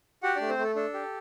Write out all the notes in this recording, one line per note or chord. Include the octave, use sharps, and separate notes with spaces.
F#4 G4 F#5
A3 D4 D5
C4 C5
A3 A4
D4 A4
G4